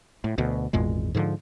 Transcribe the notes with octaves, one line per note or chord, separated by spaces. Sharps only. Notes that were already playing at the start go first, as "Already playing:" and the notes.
A2
D2 B2
G#1 E2 A#2 G#3
G#2 D3 F3